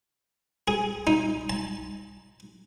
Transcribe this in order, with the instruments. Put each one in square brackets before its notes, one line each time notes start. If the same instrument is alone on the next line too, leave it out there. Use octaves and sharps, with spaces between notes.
[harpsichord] G#4
D#4
A5